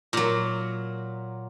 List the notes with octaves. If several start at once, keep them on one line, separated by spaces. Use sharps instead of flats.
A#2 F#3